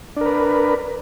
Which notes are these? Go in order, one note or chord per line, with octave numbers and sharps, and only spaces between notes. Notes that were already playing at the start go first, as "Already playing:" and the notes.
D4 A#4 B4